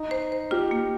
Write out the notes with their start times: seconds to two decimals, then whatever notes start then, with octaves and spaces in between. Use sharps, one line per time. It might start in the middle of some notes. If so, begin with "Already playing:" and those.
Already playing: D#4
0.11 C5
0.32 C5
0.51 F4 G4
0.71 A#3